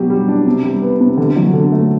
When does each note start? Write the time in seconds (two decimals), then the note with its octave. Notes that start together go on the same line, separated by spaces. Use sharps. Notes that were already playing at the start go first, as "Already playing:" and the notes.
Already playing: B2 F#3 G4
0.10 G3
0.28 D4
0.46 C3
0.64 G3
0.82 B3
1.00 C3
1.17 D3
1.36 F#3
1.53 D3
1.72 A3